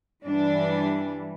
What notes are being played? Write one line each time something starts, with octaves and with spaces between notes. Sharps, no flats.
G2 E3 G3 D4